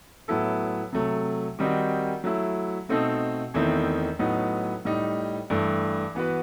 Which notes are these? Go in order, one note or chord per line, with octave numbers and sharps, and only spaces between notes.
A2 F#3 B3 E4 A4
C3 F#3 A3
D#3 G3 C4 D#4 F#4
F#3 A3 E4
B2 A3 C4 D#4 A4
E2 D#3 A3 C4 E4
A2 F#3 B3 D#4
A2 G3 D#4
G2 E3 A3
E3 B3 F#4 B4